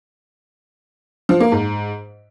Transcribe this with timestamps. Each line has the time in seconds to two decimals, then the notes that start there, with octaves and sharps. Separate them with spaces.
1.29 F3
1.40 A#3
1.52 G#2